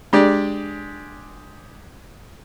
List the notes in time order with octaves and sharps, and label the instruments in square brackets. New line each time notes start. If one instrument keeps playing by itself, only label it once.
[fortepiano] G#3 G4 D5 [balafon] D4